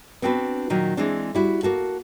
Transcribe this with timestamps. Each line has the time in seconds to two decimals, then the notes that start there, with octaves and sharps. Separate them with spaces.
0.22 B3 C4 D4 F#4 B4
0.70 A#2 D#3 F#3 A#3
0.97 E3 G#3 C4 D4
1.35 G3 E4 F#4
1.63 A#3 F#4 A4